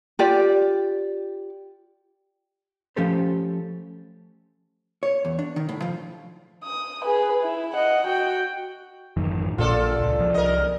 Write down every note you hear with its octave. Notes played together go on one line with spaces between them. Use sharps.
F4 G4 D5
F3 A3 C#4 G4 A4 C5
C#5
E2
D4
D#3
A2
F3
D#6
G#4 B4
E4
D#5 F#5
F#4 G5
A1 F#2 D#3
A#1 A#2 F4 A4 D5
C#2
C2 F3
A#4 D#5